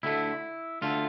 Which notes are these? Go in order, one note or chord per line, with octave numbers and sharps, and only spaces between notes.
D2 D3 A3 E4
D2 D3 A3 F4